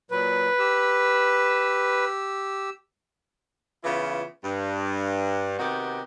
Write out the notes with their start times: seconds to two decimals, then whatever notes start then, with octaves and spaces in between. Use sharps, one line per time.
0.11 A#2 F#3 B4
0.59 G4 E6
3.84 C#3 E3 B3 E4 F4
4.44 G2
5.59 C3 D#3 B3 D#4 F#4 G4